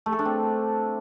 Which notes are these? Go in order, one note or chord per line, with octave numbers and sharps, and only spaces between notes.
A3
A4
D4
C4